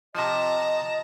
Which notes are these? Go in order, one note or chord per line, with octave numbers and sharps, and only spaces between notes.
C3 F3 D#5 A5 A#5